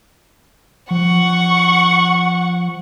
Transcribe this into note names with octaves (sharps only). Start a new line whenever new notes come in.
F3 F#5 C#6